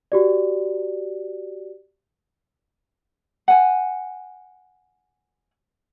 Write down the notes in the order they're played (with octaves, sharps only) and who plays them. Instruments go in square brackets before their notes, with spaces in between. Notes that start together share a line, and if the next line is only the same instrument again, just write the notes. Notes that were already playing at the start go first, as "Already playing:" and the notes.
[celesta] F#4 G4 D5
[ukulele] F#5 G#5